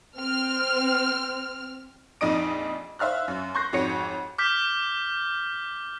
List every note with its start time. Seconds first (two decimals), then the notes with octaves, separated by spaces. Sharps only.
0.18 C4 F6
2.21 A#1 F2 D#4 D#5 D#6 D7
2.99 C5 E5 F5 F6 F#6
3.28 F#2
3.54 C6 C#6 F#6 G6 A#6 C7
3.73 F2 G#2 F#4 C#5 C#7
4.38 D6 F6 G6 B6